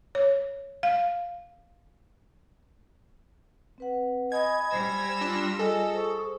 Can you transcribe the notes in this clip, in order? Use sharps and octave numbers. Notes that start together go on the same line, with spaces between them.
C#5
F5
C4 B4 F#5
D#5 G#5 B5 G#6
G3 C5 E6 A#6
D4 F4
F4 G#4 A4 D#5 G#5
C5 C#6